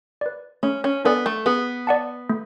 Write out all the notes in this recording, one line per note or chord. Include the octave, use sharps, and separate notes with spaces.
B4 D5
A3 C#4
C#4
B3 D4 A4 D5 G#5
A3
B3 G#4
D5 F#5 A5
A3